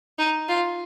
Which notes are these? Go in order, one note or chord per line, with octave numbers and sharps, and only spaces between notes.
D#4
F4